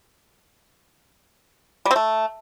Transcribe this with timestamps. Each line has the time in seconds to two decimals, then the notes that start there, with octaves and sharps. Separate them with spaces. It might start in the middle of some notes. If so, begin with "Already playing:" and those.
1.86 G3
1.91 C4
1.96 A3